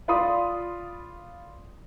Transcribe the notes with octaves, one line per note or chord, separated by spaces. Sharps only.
F4 D5 F5 B5 C6 D#6